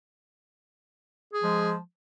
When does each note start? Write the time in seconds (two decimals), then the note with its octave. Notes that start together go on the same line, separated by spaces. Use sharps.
1.34 G#4
1.39 F3
1.44 G#3